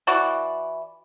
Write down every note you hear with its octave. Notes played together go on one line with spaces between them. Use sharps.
E3 F#4 D5